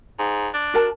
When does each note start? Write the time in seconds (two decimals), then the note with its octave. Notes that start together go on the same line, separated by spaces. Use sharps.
0.19 G#2
0.54 D4
0.74 F#4 A#4 A5